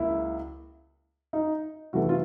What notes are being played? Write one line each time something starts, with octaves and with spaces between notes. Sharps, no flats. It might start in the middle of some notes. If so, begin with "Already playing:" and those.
Already playing: C#2 C#3 F#3 A#3 E4
D#4
C3 E3 A3 F#4
F4